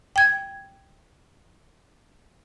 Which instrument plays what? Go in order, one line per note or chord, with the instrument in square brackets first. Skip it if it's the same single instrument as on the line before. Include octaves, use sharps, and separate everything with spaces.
[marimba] G5 G#6